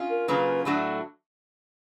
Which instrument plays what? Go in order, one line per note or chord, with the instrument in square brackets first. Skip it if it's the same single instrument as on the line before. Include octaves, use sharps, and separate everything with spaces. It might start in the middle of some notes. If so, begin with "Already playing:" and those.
Already playing: [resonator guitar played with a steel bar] C#4 F4
[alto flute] A#4
[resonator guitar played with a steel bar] C#3 F#3 A#3 C#4 F4 [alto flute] B4
[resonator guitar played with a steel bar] A2 F#3 A3 D4 F#4